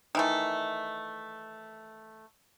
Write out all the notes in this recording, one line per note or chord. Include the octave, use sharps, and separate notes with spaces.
D#3 E3 A3